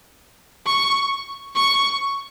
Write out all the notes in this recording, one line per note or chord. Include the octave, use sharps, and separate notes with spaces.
C#6
C#6